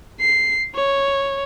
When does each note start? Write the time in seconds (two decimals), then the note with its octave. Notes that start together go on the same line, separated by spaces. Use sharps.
0.21 C7
0.75 C#5